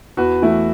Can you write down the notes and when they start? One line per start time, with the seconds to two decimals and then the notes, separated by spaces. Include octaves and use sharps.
0.17 E2 F#4 B4
0.42 E3 A3 E4